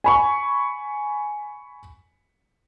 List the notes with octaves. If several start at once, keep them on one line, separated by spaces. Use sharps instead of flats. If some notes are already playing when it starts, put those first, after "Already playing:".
G#5 B5 C#6